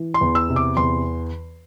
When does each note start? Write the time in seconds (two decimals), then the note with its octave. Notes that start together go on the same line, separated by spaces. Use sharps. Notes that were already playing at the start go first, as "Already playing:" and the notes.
Already playing: E3
0.14 C6
0.21 E2
0.35 E6
0.49 C3
0.56 D6
0.77 E2 C6